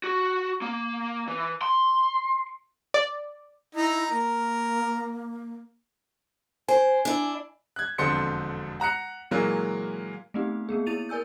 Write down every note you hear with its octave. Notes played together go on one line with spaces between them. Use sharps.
F#4
A#3
E3
C6
D5
D#4 E4
A#3 A#4
C5 G#5
D4 E4
F#6 G#6
E1 F2 D3 C5 C6 C#7
F#5 A#5 F#6 C#7
A#2 E3 F#3 G#3 A#3
A3 B3 C4 D#4 G4
A#3 B3 G#4
E4 G#4 A6 D#7 F7
A#4 D5 G#5 E6 G6